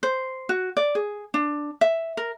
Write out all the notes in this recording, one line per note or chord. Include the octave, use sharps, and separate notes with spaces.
C5
F#4
D5
G#4
D4
E5
A#4